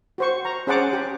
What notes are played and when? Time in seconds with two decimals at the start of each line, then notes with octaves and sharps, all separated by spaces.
0.18 F#4 C5 C#6
0.45 A#5
0.67 C#4 G#4 C5 F#5 A5 D6
0.93 G4